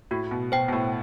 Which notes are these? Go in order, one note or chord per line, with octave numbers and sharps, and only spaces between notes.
A2 F#4
B2
B2 C5 G5
B2
A2